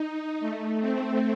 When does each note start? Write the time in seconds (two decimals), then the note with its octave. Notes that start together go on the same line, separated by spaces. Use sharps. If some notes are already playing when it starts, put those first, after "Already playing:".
Already playing: D#4
0.40 A3
0.80 C4